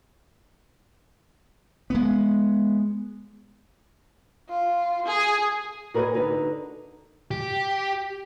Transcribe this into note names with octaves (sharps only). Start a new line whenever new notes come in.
G#3 B3
F4
G#4
F#4 A#4 B4 D5 D#5 G#5
D3 D#4 B4
G4